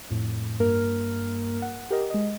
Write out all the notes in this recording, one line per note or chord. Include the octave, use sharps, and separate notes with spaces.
F2 A2
G2 A#3 A#4 F6
F#5
G4 A#4 D#5
G#3 D#5